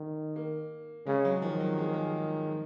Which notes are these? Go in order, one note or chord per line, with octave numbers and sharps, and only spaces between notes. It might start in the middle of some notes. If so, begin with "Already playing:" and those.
Already playing: D#3
A#3
C#3 G#3
F#3
D#3 F3
F#3
G#3
A#3
G#3
F3